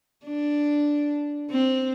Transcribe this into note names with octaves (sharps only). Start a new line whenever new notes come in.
D4
C4